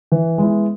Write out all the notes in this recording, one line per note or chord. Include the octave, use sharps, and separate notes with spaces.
E3
G#3 B3 E4